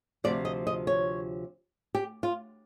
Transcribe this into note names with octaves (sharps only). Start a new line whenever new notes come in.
D2 C3 F3 D5
D#5
D#5
C#5
G4
F4